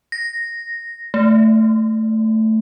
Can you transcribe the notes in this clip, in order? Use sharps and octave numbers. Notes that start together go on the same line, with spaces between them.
A#6
A3